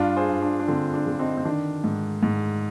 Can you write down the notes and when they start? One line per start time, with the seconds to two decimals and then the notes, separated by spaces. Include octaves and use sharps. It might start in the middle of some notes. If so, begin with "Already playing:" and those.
Already playing: G2 D4 F4
0.17 G#4 C5
0.29 G2
0.42 D4
0.59 D4
0.68 D3 C4
0.94 D4
1.07 D3
1.19 C4 D#4
1.37 C4
1.45 D#3 D4
1.84 G#2
2.23 G#2